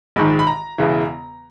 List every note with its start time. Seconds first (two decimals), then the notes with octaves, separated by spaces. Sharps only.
0.16 A#1 G#2 D#3 B5
0.39 B5
0.47 A#5
0.78 E1 E2 C#3 E3